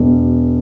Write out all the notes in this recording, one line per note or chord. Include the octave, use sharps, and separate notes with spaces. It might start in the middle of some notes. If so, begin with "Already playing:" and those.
Already playing: E1